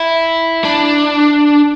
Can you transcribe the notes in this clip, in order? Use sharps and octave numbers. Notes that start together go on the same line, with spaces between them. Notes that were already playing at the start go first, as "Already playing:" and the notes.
Already playing: E4
D4